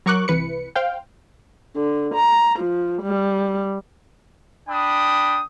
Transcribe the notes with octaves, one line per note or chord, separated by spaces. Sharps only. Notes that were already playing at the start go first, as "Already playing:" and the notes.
F#3 A#4 C#6 D6 F#6
C2 E3 B4 C#7
C5 F5 G5
D3
A#5
F3
G3
D4 G5 B5 D#6